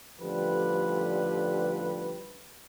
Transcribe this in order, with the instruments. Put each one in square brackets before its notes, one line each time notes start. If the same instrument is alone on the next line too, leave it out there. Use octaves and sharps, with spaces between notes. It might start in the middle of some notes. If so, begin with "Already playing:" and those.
[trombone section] A1 D3 F3 G3 G4 B4